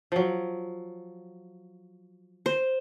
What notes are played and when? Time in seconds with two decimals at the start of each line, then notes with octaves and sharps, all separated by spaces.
0.12 F3 F#3
2.46 C5